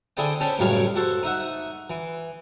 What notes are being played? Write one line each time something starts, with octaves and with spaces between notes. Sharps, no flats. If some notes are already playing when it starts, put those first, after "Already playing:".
D3 E4 G#4 C5 D5 G5
C#4 A4 C5 G5 B5
C#2 F#2 A2 G3 C#5 F5
F#4 A4 C5
D#4 E5 F#5
E3